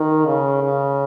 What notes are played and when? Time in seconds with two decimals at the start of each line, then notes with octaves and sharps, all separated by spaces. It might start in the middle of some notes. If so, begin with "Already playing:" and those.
Already playing: D#3
0.26 C#3
0.63 C#3